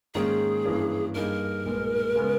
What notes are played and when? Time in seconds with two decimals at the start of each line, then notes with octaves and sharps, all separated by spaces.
0.14 G#2 D#3 A#3 C#4 G#4
0.65 G2 E3 A#3 C#4
1.14 G2 G3 A#3 D#4 G#4 A#4
1.66 B1 A#2 G#3 B3
2.16 C#3 G#3 B3